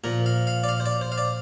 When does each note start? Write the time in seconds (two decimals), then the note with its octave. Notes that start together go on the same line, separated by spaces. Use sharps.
0.04 A#2 F3 A#4
0.26 F5
0.47 F5
0.64 D5
0.69 F5
0.80 C5
0.86 D5
1.01 C5
1.12 F5
1.18 D5